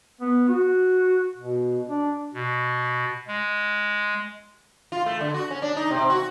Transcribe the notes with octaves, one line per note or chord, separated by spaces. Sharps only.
B3
F#4
B2
D4
B2
G#3
F4
A3
D3
F#4
C#4
D4
D#4
C3
F#4